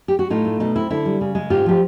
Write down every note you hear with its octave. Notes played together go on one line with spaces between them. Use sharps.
G4
F#4
A2 D#4 F4
A3
B2 D#4
C4 E4
D3 E4
G3
C#3
G#3
G#2 F4 G4
F3 G4